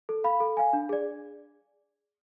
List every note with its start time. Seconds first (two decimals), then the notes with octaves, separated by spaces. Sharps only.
0.09 A4
0.24 F5 B5
0.40 A4
0.57 F5 G#5
0.73 D4
0.89 G#4 D5